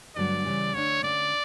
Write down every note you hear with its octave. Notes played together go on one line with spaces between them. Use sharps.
G2 D3 F#3 A3 D5
C#3 E3 G3
D3 A3 D4 C#5
D3 A3 C#4 D5